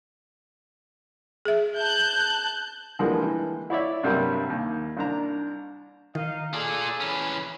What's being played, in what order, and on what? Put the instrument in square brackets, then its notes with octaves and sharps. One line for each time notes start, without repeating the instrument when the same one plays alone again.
[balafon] G#4 E5
[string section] A5 F#6 G6
[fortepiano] D3 E3 F3 G3 G#3 A#3
E3
E4 C#5 D5 E5
G2 C3 F#3 G3 A#3
D#2
C2 D4 A#5
[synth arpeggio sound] D#3 [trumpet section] D#4 D#5 F5
[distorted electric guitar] F4 D5 [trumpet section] G#4 A4
[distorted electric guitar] E3 C#4